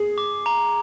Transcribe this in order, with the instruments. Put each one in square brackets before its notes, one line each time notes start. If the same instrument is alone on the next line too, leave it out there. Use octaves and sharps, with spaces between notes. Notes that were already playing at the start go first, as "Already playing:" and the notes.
Already playing: [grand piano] G#4
[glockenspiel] D6
A#5